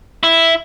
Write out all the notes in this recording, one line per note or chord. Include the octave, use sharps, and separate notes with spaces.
E4